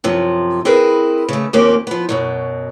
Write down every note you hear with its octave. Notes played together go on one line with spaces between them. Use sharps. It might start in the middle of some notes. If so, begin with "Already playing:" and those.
F#2 C3 F3
C4 E4 G#4 A#4 B4
C#3 A3
D#2 F3 A#3 C4 C#4 G4
F3 B3
F#2 B2 F#3